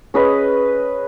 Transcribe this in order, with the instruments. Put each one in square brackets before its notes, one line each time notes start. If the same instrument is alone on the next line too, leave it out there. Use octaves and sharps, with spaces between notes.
[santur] C#4 G#4 B4 D#5